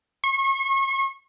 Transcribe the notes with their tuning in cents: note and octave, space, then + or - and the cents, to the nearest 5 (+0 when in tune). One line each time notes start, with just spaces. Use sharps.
C#6 -35